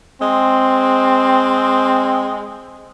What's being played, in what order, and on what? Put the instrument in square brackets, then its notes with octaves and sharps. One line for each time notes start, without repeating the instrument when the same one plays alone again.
[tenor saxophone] G#3 [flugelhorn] C4